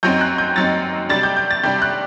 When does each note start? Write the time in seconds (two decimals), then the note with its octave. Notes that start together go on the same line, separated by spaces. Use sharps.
0.03 F#2 F#3 C4 D#4 G6
0.21 F#6
0.38 G6
0.56 F#2 F#3 C4 D#4 A6
1.09 C3 G3 D4 A6
1.23 G6
1.37 G6
1.51 A6
1.63 C3 G3 D4 G6
1.82 F#6